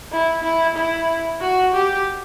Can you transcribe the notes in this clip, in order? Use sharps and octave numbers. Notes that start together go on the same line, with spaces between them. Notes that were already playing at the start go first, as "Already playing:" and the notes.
E4
E4
E4
F#4
G4